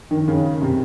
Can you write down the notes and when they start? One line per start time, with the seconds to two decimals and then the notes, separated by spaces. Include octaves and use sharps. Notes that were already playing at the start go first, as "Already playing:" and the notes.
0.11 D#3
0.28 C#3
0.62 C3